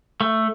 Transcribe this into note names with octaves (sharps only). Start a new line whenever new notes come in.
A3